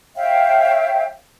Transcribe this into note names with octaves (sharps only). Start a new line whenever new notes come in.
C#5 E5 F5 G5